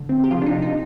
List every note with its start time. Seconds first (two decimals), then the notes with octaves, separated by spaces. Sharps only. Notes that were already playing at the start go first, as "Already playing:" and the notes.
Already playing: D3
0.09 C4
0.24 G4
0.31 C3 F3 F4
0.42 D4
0.46 C3 D#4
0.62 D#4